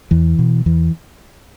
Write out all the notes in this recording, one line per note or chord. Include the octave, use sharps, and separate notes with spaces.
E2 E3
B2
E2 E3